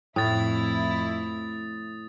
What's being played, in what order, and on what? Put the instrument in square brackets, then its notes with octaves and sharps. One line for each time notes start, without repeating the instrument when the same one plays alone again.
[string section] F2 E4 [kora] A2 [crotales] D#6 A6